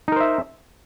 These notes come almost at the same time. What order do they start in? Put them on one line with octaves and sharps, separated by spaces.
D#4 A#4 C5 E5